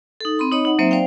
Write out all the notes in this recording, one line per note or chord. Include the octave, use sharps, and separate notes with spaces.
D#4 A4
C4 B5 C6
D#4 C#5 D#5 B5
D#4 F#5
F#3 A#3 C4 D#4 C5 E5
C5 D5 F5 G5